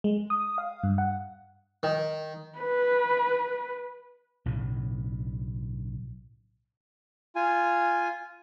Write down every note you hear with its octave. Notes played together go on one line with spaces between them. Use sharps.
G#3
D#6
F5
G2
F#5
D#3
B4
B1 A2 C#3
F4 G#5